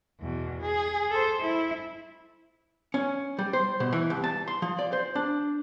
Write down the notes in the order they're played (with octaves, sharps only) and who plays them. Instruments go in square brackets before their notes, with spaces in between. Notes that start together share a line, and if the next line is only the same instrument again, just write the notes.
[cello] E2 B2
G#4
A4 C5
E4
[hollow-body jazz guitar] C#4
G3
C5
B2
E3
C2
A5
C6
F3
D5
C5
D4